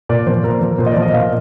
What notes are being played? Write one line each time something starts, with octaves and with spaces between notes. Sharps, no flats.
A#2 D5
F3 C5
A#2 A#4
F3 A#4
A#2 C5
D#5
D5
F3
D#5
A#2 F5